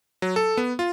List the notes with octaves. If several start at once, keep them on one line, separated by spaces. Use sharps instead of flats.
F#3
A4
B3
F4